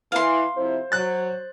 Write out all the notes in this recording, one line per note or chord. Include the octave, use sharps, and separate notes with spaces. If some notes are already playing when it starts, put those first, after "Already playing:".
E3 F5 C6
F2 C3 E4 C5
F#3 F#6 A6